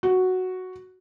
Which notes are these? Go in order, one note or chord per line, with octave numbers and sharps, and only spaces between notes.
F#4